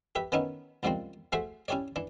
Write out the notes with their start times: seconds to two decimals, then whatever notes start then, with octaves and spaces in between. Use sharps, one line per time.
0.15 G4 B4 E5
0.32 D#3 E3 B3 C#4 D#4 E4
0.83 C#2 G#2 F3 G3 A#3 C4
1.32 A3 F#4 G#4 C5 E5 F#5
1.68 C#4 E4 G4 C#5 D5
1.96 E3 D4